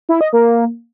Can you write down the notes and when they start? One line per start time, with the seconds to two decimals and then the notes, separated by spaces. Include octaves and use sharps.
0.09 E4
0.21 D#5
0.33 A#3